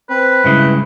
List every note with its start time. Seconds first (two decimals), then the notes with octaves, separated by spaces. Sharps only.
0.10 C4 B4
0.44 G2 C#3 G#3 E4